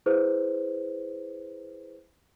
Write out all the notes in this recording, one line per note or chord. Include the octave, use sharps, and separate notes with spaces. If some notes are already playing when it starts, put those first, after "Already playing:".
E4 G#4 B4 C5